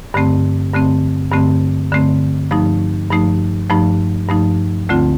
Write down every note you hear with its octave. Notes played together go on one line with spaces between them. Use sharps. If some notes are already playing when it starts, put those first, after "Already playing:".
G2 D3 A3 C4
G2 D3 A3 C4
G2 D3 A3 C4
G2 D3 A3 C4
G2 F3 A3 D#4
G2 F3 A3 D#4
G2 F3 A3 D#4
G2 F3 A3 D#4
D2 D3 A3 C4 F4